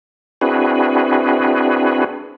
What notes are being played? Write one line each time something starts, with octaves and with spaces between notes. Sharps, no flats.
C4 D4 E4 F#4 G#4 B4